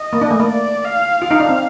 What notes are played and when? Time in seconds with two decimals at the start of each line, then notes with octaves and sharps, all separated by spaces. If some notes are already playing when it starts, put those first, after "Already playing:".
Already playing: D#5
0.13 A#3
0.21 D4
0.31 A3
0.40 A#3
0.49 D5
0.85 F5
1.22 F4 F5
1.31 D#4
1.40 D4
1.49 C4